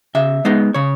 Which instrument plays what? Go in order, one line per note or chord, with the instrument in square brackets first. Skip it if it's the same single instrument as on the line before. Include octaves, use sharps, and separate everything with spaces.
[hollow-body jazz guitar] C#3 E5
G#3 B3 D#4
C#3 C#5